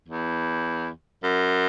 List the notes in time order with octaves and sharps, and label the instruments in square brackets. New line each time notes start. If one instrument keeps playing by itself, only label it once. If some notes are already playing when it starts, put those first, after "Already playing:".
[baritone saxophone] E2
F#2